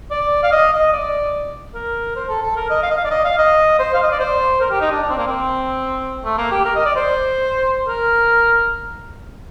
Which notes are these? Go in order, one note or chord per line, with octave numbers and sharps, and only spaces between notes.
D5
F5
D#5
D#5
D5
A#4
C5
A4
A4
A#4
D#5
F5
D#5
F5
D5
D#5
F5
D#5
C5
F5
D#5
D5
C5
A#4
G4
D#4
D4
D4
C4
A#3
C4
A3
A#3
G4
A#4
D#5
D5
C5
A#4